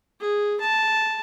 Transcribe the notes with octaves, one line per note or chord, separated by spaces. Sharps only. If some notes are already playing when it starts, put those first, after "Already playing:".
G#4
A5